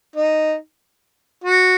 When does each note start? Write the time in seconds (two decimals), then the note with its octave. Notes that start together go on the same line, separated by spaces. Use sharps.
0.16 D#4
1.44 F#4